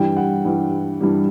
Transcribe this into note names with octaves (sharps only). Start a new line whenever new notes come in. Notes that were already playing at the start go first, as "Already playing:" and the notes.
Already playing: G2 E3 G3 G5
F#5
G2 E3 G3
G2 E3 G3